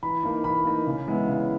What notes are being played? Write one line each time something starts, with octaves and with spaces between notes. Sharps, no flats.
E3 B5
A#3 D#4
E3 B5
A#3 D#4
C#3
E3 G#3 B3 E4
C#3